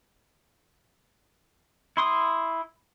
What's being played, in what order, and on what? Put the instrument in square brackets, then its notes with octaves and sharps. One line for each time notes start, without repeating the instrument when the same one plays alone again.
[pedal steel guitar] E4 C6 D#6